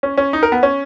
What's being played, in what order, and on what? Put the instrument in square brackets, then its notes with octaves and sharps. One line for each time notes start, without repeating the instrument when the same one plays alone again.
[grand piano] C#4
C#4
D#4
A#4
B3
C#4